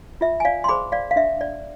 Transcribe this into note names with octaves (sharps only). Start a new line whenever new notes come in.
F4 E5
G#5
D5 F5
C6
G#4 C5 B5 D6
D5 F5
F5
D4 E5
D5